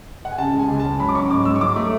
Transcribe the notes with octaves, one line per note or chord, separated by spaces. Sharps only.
F#5
G#5
C#3 A5
G#3
G#5
C#2
A5
C#4
F#3 B5
D6
C#4 C#6
G#2 D6
G#2 E6
C#6
F#3 D6
A3